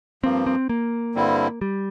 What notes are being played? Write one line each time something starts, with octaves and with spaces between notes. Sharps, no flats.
G2 F3 A#3 C4
C4
A#3
G2 D3 G3 C4 E4
G3